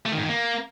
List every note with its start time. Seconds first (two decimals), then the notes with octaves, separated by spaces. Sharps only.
0.06 A3
0.11 D#3
0.17 G#2
0.23 D#3
0.29 A#3